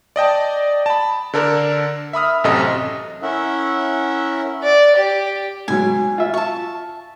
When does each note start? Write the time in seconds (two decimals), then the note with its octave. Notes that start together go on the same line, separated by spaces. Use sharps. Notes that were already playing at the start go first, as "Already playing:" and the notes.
0.16 D5 D#5 G5 A5
0.86 A5 B5
1.33 D3 D4 A4 A#4
2.13 E5 B5 D#6 F6
2.44 A1 F#2 C3 A4 D#5
3.22 C#4 E4 A#4 E5 F#5
4.63 D5
4.96 G4
5.68 G#2 B2 F#3 G#5
6.18 F4 E5
6.34 A5 C#6